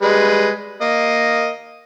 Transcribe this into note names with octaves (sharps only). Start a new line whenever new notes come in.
G3 G#3 B4
A#3 D#5